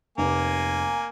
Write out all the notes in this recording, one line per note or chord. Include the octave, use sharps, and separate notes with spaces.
F1 A#3 G#5